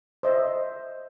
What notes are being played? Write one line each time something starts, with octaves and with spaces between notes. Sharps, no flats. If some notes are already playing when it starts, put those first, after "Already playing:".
C5 D#5 E5